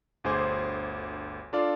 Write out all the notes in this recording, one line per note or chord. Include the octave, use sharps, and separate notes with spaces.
G1 D2 G#4 C5 D6 G#6
D4 F4 A4 D5 F5